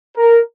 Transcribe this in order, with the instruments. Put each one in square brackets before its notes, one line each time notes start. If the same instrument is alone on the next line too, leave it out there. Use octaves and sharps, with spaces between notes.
[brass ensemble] A#4